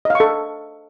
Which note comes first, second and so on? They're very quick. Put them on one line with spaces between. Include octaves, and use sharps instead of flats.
D#5 F5 C#6 A4